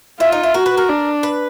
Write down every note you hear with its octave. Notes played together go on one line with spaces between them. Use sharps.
E4 F4
D#4
E4
F#4 A#4
B4
A#4
D4
B4